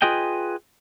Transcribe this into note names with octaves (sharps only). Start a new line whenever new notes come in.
F4 G#4 B4 D#5 G5